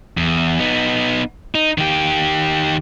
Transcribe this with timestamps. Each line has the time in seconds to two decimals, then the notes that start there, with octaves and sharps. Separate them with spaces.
0.17 E2
0.60 B3 D#4
1.55 D#4
1.78 D#3 G4